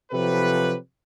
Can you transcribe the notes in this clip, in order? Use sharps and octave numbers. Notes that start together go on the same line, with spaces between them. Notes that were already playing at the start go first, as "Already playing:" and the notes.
C3 F3 F#3 G4 A4 B4